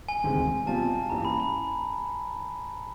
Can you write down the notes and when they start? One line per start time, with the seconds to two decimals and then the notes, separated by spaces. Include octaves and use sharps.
0.08 G#5
0.23 E1 D2 C3 D#3 G#3
0.66 B2 G3 C4 F4 A5
1.10 A1 G2 E3 G3 A#3 A#5
1.25 B5
1.40 B5